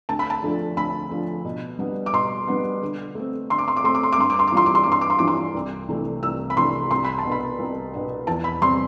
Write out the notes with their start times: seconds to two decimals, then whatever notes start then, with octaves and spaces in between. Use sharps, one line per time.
0.09 D2 A5
0.19 B5
0.30 A5
0.43 D3 F3 A3 D4
0.77 D2 B5
1.11 D3 F3 A3 D4
1.45 B2
1.79 G3 B3 D4
2.06 D6
2.13 B2 C6
2.47 G3 B3 D4
2.82 D3
3.15 A3 C4
3.50 D3 C6
3.58 D6
3.68 C6
3.77 D6
3.84 A3 C4 C6
3.94 D6
4.03 C6
4.12 D6
4.18 G2 C6
4.30 D6
4.39 C6
4.47 D6
4.52 E3 G3 D4 F4 C6
4.66 D6
4.75 C6
4.84 G2 D6
4.92 C6
5.01 D6
5.10 C6
5.19 E3 G3 D4 F4 D6
5.27 C6
5.54 C2
5.88 C3 E3 A3 D4
6.23 C2 E6
6.50 B5
6.57 C3 E3 A3 D4 C6
6.91 C2 C6
7.04 B5
7.18 A5
7.25 B2 B3 D4
7.32 B5
7.59 C2
7.94 B2 B3 D4
8.27 E2 A5
8.44 B5
8.61 C3 G3 C4 C6